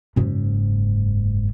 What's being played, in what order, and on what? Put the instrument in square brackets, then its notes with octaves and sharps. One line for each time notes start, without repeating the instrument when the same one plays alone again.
[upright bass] F#1 G#2